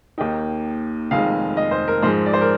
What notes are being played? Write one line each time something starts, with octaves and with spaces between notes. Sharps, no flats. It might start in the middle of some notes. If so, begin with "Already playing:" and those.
D#2 D#3 A#3 D#4 G5
F1 F2 D#3 G#3 F5
D#5
C5
A#4
G#2 F3 G#3 C5
D5
C5
A#4